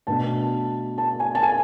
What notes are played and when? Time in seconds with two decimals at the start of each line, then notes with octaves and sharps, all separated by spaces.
0.07 B2 A3 D4 A5
0.98 A5
1.20 G#5
1.35 A5
1.43 G#5